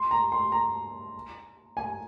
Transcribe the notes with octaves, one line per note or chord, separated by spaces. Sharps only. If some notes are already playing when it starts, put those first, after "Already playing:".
Already playing: C6
A#5
C6
A#5
G#5